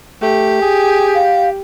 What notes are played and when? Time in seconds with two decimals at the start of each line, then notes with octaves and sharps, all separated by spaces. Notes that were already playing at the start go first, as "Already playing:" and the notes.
0.22 A3 G4
0.62 G#4
1.15 F5